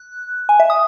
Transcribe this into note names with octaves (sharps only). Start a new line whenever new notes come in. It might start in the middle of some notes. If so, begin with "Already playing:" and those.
Already playing: F#6
G#5
E5
D#6